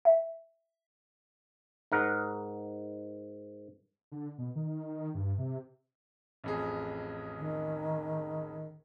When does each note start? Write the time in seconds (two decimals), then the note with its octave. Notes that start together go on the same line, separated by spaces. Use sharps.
0.05 E5
1.92 G#2 A#4 F#5
4.12 D3
4.38 B2
4.55 D#3
5.15 G2
5.38 C3
6.44 A1 F2 G#4
7.38 D#3